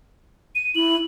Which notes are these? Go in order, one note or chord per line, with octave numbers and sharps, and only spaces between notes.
D#7
E4 F#7